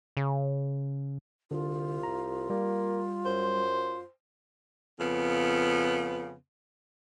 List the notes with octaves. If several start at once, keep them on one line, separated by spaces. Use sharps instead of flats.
C#3
C2 D3 F4
A#5
G3 A#3
F#2 C5
F2 C#3 B3